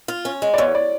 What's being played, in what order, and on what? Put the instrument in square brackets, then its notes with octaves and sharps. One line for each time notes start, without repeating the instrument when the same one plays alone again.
[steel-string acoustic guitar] F4
C#4
G#3
[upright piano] D5
[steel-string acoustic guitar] E2 [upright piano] C#5
[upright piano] D5